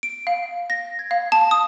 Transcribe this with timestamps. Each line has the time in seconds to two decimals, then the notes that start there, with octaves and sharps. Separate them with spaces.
0.03 D7
0.27 F5
0.70 A#6
0.99 G#6
1.11 F5
1.32 A5
1.51 D#6